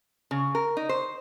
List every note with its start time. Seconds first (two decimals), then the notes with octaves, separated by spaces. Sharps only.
0.31 C#3
0.55 A#4
0.77 D#4
0.89 C5